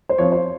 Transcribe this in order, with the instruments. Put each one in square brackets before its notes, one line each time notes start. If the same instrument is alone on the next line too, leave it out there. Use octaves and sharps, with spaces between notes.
[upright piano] C5
F3 C4 F4 C#5
C5